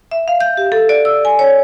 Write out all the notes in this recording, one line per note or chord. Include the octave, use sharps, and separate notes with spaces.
E5
F5
G6
G4
A4
D5
E6
G#5
C#5